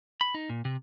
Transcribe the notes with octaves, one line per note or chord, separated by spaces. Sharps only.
B5
D#4
A#2
C3